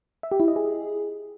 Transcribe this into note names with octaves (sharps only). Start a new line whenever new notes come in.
E5
G4
E4
D#5
G#4